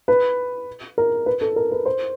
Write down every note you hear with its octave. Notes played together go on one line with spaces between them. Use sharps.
B4
A#4
B4
A4
A#4
B4
C5